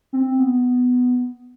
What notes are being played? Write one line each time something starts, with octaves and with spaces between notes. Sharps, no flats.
C4
B3